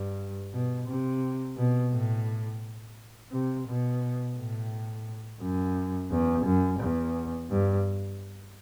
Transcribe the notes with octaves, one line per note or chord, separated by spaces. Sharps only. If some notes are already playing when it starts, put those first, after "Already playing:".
Already playing: G2
B2
C3
B2
A2
C3
B2
A2
F#2
E2
F#2
E2
G2